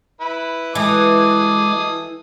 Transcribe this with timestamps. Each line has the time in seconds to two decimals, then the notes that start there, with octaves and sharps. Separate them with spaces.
0.21 E4 B4
0.75 E3 G#3 A4 G#5 D6 D#6